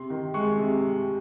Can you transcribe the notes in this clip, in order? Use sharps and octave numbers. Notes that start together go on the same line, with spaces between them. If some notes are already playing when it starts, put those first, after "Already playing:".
Already playing: C3 C6
D#3
G#3 C#6
C3